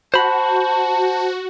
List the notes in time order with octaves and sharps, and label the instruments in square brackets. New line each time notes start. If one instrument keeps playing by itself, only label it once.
[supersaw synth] F#4 [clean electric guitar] C5 B5 [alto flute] A5